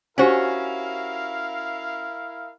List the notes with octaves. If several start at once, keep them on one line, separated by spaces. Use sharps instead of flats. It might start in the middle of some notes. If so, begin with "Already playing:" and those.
C#4 E4 F#4 G4 A#4 C5 F5 G#5